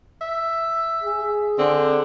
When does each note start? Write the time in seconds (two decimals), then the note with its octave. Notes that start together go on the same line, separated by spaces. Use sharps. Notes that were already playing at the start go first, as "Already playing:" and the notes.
0.21 E5
1.03 G#4
1.58 D3 C4